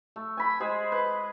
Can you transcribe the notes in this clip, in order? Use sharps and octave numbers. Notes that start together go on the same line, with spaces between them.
A3
G#5 B5
G#3 G#4 C5
B4